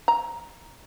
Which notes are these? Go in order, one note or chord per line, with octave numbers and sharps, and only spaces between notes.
A#5